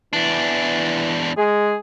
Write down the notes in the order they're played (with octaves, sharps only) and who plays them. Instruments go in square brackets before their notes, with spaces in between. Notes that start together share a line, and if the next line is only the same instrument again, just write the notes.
[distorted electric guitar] E2 D4 [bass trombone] E3
[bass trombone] G#3 [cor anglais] G#4